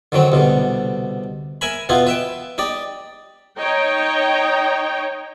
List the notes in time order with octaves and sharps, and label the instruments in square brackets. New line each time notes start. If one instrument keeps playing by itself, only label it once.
[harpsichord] D3 D#3 F#3 C4
C2 B2 D3
A#4 E5 G#5 B5
B2 B3 E4 F4
B4 E5 G5
D#4 G4 D5
[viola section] D#4 C#5 D#5 G5